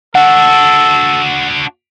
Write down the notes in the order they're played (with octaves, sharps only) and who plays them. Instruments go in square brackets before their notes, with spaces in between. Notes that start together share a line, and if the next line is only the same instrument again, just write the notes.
[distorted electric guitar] D4 F#4 [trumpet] A4 [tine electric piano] F#5